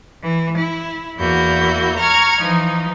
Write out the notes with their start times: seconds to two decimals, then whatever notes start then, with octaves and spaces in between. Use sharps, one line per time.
0.22 E3
0.57 E4
1.18 E2 A#3 E4 F#4 G6
1.97 A#5 C#6 F6 G#6
2.39 E3 F3 D#4